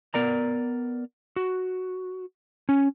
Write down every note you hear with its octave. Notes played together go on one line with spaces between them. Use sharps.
B3 A#4 D5 A#5
F#4
C#4